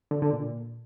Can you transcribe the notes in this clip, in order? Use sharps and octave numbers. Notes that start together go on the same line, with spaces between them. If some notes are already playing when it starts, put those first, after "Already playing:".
D3
D3
A#2